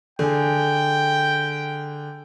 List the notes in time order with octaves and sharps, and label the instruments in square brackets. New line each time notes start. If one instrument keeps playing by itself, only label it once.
[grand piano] D3 G#4 [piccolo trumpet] G5